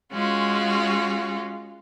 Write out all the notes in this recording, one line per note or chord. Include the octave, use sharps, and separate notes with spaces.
G#3 C#4 F4 F#4